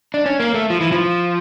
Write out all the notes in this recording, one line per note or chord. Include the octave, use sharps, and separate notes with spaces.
D4
C#4
A#3
A3
F3
E3
F3